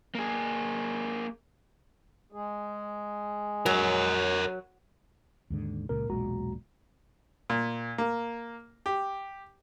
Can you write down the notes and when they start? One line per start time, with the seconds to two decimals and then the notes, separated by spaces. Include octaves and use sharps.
0.15 A#3 G#4
2.32 G#3 G#4
3.66 F#3 A#4 C#5
5.50 D#2 G#2 D3
5.89 C#2 A#2 C#3 A#4
6.10 E1 B1 A#2 G#3 F#4 A#5
7.50 A#2
7.98 A#3
8.86 G4